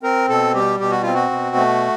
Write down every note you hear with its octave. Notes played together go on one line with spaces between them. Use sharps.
C4 A#4
B2 A4
G3 G4
B2 G4
F#4
C4 F4
F#4
B2
A3